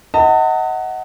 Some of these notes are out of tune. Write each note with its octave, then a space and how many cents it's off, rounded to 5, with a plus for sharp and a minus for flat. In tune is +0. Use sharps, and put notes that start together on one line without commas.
D#5 +25 F#5 +10 A5 +40